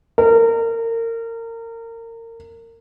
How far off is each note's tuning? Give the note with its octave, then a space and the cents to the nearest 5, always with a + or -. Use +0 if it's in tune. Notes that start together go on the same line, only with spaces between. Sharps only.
A#4 -30